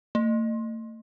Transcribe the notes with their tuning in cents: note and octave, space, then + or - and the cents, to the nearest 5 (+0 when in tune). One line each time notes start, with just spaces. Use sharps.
A3 +40